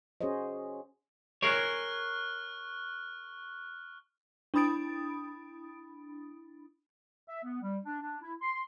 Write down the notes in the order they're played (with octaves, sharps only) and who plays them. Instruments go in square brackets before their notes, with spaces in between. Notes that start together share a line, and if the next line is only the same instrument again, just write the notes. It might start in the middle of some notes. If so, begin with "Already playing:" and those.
[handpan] C#4 F#4 G#4 C5 C#5 D#5
[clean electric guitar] G#4 A#4 C#5 [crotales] C#6 F6 F#6
[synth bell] D4 E4 B5 D#6 A6 D7
[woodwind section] E5
B3
G3
D4
D4
E4
C6